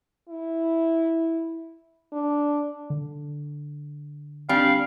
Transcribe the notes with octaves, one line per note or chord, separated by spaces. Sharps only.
E4
D4
D3
G3 C4 D4 F5